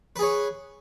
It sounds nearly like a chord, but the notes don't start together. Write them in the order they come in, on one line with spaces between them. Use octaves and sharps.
B4 G#4 C#5